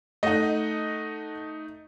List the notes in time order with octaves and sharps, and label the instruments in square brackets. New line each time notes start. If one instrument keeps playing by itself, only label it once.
[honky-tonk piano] A3 D#4 [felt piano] D#5 F#5